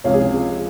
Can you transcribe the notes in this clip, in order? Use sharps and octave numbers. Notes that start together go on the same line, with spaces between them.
C#2 C3 F3 C#5 F5
G#4